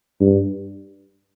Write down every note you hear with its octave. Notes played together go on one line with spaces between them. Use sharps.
G2